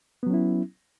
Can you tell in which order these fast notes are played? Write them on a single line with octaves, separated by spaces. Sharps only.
B3 F#3 C#4 E4